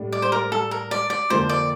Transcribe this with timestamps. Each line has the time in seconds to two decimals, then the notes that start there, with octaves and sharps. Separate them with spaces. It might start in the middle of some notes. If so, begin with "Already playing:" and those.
Already playing: A2 G3 D4
0.12 D5
0.22 C5
0.32 A#4
0.52 A4
0.71 A#4
0.91 D5
1.10 D5
1.30 F2 D3 F3 A#3 C5
1.49 D5